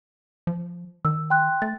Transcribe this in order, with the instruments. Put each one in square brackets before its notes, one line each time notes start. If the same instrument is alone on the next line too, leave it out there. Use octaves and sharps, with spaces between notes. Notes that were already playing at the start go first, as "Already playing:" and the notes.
[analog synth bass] F3
[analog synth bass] D#3 [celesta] E6
[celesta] G5 C6 F#6
[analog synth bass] A3 [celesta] A6